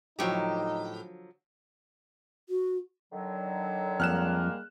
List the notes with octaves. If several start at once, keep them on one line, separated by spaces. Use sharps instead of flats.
A2 D3 F3 F#3 D#4 G4
F#4
D3 D#3 F#3
F2 G3 G#3 A#3 F6 F#6 E7